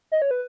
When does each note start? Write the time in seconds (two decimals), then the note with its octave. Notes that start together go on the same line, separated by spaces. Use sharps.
0.12 D#5
0.22 C#5
0.31 B4